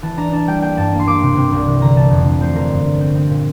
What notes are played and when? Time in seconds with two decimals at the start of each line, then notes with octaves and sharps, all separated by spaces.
0.02 E3 A5
0.17 D4 A#5
0.33 D4 A5
0.47 G3 G5
0.62 A#3 G5
0.77 G2 A5
0.92 A#3
1.00 C6
1.07 A#3 D6
1.22 C3
1.37 C3
1.52 C2
1.67 E3
1.81 D3 A#5
1.96 A3 A5
2.11 F2
2.26 D3
2.41 F3 C5
2.56 D3 A#4
2.70 G2
2.85 G2
3.01 C4
3.15 C4
3.30 A#2